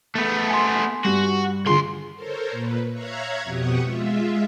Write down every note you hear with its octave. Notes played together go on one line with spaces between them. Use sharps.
A3 B3
G#5 C6
G2 F#4
D2 D3 F4 G#4 C6
A4 A#4 C5 C#5
A#2 B4
C#5 E5 F5 A#5 F#6 G#6
F2 B2 G4 F#5 C#6 D#6
G#3 F4 E5